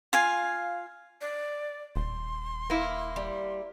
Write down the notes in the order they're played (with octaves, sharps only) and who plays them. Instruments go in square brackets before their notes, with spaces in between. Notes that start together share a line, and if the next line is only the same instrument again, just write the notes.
[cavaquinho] F4 F5 G#5
[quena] D5
[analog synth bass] D#1 [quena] C6
[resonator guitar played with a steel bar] A#3 E4
[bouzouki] G3